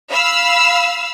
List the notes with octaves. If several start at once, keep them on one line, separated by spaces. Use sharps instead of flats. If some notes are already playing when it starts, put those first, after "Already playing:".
F5 B5 E6